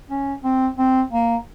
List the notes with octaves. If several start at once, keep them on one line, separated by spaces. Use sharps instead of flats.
C#4
C4
C4
A#3